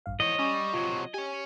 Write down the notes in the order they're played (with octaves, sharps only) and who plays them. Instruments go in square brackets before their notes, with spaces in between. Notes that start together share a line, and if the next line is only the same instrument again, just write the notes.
[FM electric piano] A1 G2 F5
[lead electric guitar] G#2 C#5 [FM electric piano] E3 [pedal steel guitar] D#5
[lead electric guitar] G3 [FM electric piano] C#4 G#5 [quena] C#6
[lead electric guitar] C3 F#3 [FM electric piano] F4 G#6
[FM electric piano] G4 [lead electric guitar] C#5 G#5